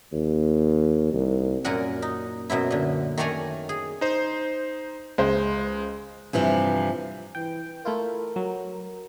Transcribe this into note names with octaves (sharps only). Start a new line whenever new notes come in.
D#2
C2
F#2 A#2 A#4 F#5 G#5
D#4
F#2 B2 F#3 E4
A#2 D3
D#3 A3 C#5 D5 G#5 A#5
G#4
D#4 C5
C#2 G#3 C5
G2 C3 E3 F3
E3 G5
A3 E4 F4 A#4
F#3